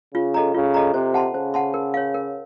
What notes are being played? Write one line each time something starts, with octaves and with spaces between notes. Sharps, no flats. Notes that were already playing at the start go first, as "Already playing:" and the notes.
C#3 F4
A4 D#5 A#5
C#3 F4
A4 D#5 A#5
C3 C5
F#5 A5 C6
C#3 C5
F#5 A5 C6
A#4
C#5 F5
A#4